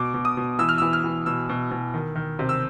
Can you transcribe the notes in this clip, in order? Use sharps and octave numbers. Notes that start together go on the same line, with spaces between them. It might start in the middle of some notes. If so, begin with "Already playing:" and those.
Already playing: B2 D6
B2
D#6
B2
E3 E6
F6
E3 E6
F6
E3
B2 E6
B2
B2
D#3
D#3
C3
E6